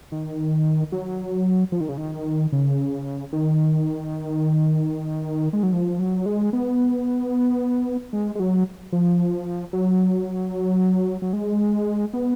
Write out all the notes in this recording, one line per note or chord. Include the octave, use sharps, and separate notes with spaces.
D#3
F#3
F3
D#3
C#3
D#3
C#3
D#3
G#3
F#3
F3
F#3
G#3
B3
G#3
G#3
F#3
F3
F#3
F#3
G#3
B3